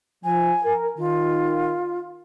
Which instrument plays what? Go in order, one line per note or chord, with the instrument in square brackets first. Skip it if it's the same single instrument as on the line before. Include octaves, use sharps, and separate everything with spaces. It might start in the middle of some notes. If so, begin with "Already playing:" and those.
[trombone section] F3 [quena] G#5
[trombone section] A#4
[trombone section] D#3 [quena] F4